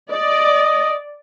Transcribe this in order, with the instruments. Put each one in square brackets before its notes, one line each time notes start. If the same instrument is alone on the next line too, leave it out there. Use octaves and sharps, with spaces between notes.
[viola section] D5 [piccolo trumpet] D#5